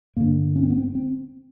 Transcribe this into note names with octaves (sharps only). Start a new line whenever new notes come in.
G2 D3 A#3
C#4
C4
B3
C4
C4